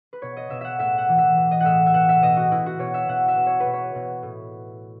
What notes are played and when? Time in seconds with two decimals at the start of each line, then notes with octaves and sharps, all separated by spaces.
0.13 B4
0.22 B2 C#5
0.37 D#5
0.50 B2 E5
0.61 E5 F#5
0.79 A2 E5
0.98 F#5
1.08 E3
1.18 E5
1.37 E3
1.51 D#5
1.60 A2 E5 F#5
1.86 E5
1.94 B2 F#5
2.09 E5
2.22 B2 D#5
2.37 F#4
2.51 B2 E4
2.66 F#4
2.79 B2 C#5
2.94 E5
3.08 B2 F#5
3.28 E5
3.37 B2
3.46 C#5
3.60 B4
3.66 B2
3.73 C#5
3.95 B2
4.23 A2